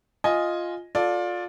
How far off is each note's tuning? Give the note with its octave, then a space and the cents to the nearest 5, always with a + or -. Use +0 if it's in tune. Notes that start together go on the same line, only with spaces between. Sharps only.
F4 +0 D#5 +0 G#5 +0
F4 +25 A4 +0 D5 +0